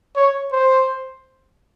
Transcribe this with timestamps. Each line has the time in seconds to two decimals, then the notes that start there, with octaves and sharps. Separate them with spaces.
0.16 C#5
0.52 C5